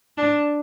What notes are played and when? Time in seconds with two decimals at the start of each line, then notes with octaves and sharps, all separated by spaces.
0.17 D4